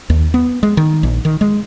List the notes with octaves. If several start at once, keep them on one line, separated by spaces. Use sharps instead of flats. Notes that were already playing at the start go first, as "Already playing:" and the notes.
D#2
B3
G#3
D#3
A#1
D#3
G#3